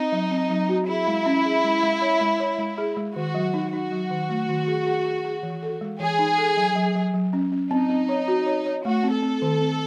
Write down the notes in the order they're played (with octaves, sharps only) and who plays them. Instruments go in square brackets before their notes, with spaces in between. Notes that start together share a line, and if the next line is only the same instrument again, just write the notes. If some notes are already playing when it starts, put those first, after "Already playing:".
Already playing: [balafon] C4 [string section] D#4
[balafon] F#3
C4
F#3
F#4
[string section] E4 [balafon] G#4
[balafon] G#3
C#4
G#4
G#3
G#3
C#5
G#3
C#5
G#3
G#4
G#3
[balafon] D#3 [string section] F#4
[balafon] F#3
D#4
[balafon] D#4 [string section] F#4
[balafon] F#3
D#3
A3
D#3
G#4
G#4
G#4
G#4
E3
A4
G#3
[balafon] E3 [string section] G#4
[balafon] D#4
A4
F#3
F#3
F#3
F#3
C#4
C#4
[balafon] C4 [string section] D#4
[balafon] C4
C#5
F#4
C#5
C#5
[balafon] A3 [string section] F#4
[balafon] C4
[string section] A4
[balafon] C4
D#3
C4